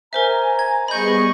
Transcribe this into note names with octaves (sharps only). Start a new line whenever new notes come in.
A#4 C5 E5 G#5 A#5
G#6
G3 B3 G#4 D#5 B5 C#6 G6